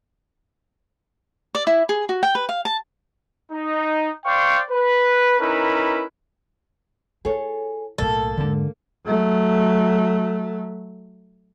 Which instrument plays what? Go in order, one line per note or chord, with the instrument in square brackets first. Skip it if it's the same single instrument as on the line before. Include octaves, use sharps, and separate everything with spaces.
[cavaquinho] D5
E4
G#4
F#4
G5
B4
F5
A5
[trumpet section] D#4
C5 D5 F5 G5 C#6
B4
C#4 D#4 E4 A#4 B4
[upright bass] E4 [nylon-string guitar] G#4 A4 C#5
[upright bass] B1 A2 [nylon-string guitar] A#3 [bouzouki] A4
[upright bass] E2 G#2 [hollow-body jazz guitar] D3 A5
[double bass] F#3 A3